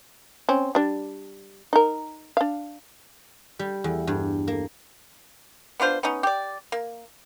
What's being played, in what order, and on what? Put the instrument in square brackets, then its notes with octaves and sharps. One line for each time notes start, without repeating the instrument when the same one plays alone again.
[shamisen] C4 C#4
G3 D4
D#4 A#4
D4 F5
[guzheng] G3
E2
G2
A#3
[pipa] B3 D4 F4 C5
B3 C#4 D#4
G4 D5
A#3